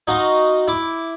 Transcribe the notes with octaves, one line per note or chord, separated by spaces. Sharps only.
D#4 F#4 F5 A#5 C6
E4 D6